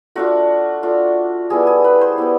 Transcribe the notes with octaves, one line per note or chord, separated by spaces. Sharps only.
A3 D4 F4 F#4
A3 D4 F4
G3 B3 E4 G#4
G#4
B4
C5
G3 B3 E4